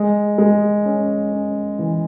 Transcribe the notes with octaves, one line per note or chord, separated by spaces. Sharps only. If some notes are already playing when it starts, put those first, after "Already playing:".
Already playing: G#3
G#3
C#4
C#4
E3